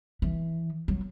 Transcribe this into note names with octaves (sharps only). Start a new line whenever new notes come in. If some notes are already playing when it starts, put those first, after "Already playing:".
E3
F#3